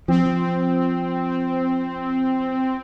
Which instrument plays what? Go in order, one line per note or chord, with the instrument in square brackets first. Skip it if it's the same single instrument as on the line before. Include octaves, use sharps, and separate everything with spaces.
[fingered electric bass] F3 [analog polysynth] C4